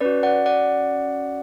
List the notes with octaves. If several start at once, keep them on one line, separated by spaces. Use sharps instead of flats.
C#4 F#4 B4 D5
D5 F#5
D5 F#5